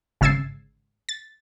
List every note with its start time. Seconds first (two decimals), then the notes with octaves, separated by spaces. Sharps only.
0.21 G#1 C#3 E6 G#6 A6 C7
1.09 A6